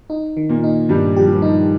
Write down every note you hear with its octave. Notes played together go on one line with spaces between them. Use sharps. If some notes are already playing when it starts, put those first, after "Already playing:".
D#4
D#3
A#2 A#3
D#4
G2 D#3 G3
F3 G4
G3
F3
D#3 D#4